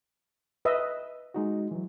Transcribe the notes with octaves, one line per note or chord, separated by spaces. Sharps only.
B4 D#5 E5
G#3 D#4 F#4
E3 F#3